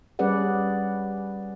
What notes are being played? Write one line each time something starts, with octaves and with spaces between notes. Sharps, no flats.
G3 C#4 G#4 B4 D5 F#5